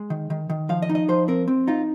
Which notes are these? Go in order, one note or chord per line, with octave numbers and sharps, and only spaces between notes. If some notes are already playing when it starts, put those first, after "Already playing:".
Already playing: G#3
D#3
D#3
D#3
F3 F5
D#5
D#4
D#5
F3 C5
C4 A#4
C4
D#4 F4